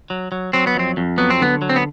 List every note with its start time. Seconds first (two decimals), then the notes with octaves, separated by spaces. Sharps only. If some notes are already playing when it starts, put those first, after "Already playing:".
0.10 F#3
0.32 F#3
0.53 F#3 C4
0.67 B3
0.75 F2 C4
0.97 F2
1.18 F#3 B3
1.30 C4
1.40 D3 B3
1.62 F#3
1.69 C4
1.76 B3